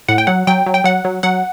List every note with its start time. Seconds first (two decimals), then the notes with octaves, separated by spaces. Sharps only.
0.09 A2 F#5
0.18 G5
0.27 F#3 F#5
0.47 F#3 G5
0.66 F#3
0.74 G5
0.84 F#3 F#5
1.05 F#3
1.23 F#3 F#5